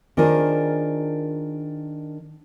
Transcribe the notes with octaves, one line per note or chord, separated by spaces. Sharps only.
D#3 D4 F4 G#4 A#4 C5